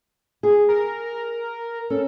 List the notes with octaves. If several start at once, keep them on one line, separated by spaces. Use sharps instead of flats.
G#4
A#4
C#4 A4